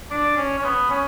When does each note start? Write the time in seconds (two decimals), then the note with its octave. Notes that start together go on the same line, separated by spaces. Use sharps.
0.10 D4
0.37 C#4
0.58 C#4
0.64 B3
0.90 C#4